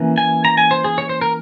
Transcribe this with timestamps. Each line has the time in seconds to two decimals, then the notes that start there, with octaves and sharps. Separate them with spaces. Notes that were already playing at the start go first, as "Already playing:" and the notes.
Already playing: E3 A#3 C#4
0.18 G#5
0.45 A#5
0.57 G#5
0.71 C5
0.84 G#4
0.98 C#5
1.09 C5
1.21 A#4